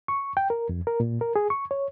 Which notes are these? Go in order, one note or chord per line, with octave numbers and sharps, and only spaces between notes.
C#6
G5
A#4
F2
A#4
A#2
A#4
G#4
C#6
C#5